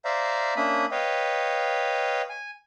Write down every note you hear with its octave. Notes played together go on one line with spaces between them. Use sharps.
C5 D5 E5 F5 A#5
A#3 C#4 D4 E5 B5 D#6
B4 C#5 D#5 F5 G5
G#5